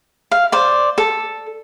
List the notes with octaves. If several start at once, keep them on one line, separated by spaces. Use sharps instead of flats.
F5
C5 D5
A4